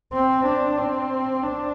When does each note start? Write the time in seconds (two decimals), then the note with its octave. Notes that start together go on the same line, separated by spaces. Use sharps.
0.14 C4
0.46 D4
0.78 C4
1.43 D4